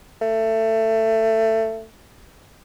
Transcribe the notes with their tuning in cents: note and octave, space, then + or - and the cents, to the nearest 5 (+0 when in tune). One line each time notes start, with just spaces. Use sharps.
A3 +20